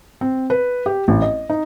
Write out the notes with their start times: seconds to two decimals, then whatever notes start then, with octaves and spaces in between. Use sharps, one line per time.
0.21 C4
0.50 B4
0.86 G4
1.08 A1
1.22 D#5
1.50 D#4